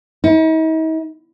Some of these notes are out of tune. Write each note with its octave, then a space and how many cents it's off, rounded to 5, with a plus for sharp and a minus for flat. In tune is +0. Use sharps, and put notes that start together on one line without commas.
D#4 +45